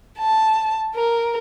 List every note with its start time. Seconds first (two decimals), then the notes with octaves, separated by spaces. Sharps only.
0.19 A5
0.95 A#4